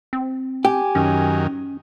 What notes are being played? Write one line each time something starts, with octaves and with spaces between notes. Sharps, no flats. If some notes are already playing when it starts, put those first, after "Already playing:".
C4
G4 G#5
F#2 D#3 C#4